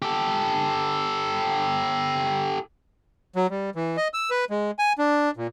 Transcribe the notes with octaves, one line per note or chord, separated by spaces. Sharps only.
G4 A4
F#3
G3
E3
D#5
E6
B4
G#3
G#5
D4
A#2